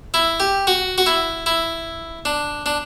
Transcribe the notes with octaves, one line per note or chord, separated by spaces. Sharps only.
E4
G4
F#4
F#4
E4
E4
D4
D4